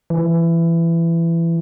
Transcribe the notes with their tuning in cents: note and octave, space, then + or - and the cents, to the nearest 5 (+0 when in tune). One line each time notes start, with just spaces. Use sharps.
E3 +20